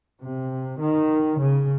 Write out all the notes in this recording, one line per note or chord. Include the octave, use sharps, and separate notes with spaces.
C3
D#3
C#3